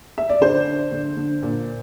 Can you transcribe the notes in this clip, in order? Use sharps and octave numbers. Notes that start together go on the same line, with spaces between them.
E5
D5
D3 C5
D4
D3
D3
A#2